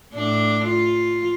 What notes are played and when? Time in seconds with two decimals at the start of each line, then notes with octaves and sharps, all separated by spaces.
0.13 A2 D4
0.65 F4